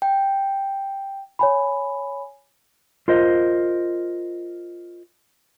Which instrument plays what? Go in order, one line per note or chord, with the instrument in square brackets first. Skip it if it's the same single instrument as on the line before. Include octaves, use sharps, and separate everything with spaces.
[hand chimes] G5
[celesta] C#5 G#5 B5
[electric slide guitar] F4 A#4 C5 D#5